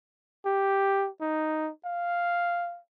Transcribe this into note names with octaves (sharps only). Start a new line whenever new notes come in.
G4
D#4
F5